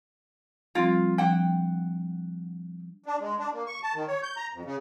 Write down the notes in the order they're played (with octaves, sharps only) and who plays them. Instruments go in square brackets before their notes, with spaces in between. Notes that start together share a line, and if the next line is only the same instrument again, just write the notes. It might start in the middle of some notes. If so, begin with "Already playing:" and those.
[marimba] F3 G3 C4 [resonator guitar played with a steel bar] F4
[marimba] F3 D4 [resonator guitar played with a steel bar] F#5 G5
[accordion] D4
G#3
D4
A#3
C#6
A5
D#3
C#5
G6
A#5
F2
C#3